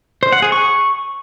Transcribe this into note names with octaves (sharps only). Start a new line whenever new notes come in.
C5
F#5
G#4
C#6